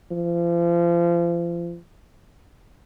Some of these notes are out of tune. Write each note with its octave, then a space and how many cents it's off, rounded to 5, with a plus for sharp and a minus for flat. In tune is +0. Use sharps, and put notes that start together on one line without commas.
F3 -35